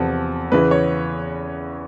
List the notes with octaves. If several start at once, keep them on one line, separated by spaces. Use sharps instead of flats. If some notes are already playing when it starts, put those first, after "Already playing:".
Already playing: E2 C3 F3 A4
E2 C#3 E3 B4
C#5